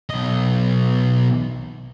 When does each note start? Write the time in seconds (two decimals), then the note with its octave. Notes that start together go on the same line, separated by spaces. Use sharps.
0.10 B1 D#5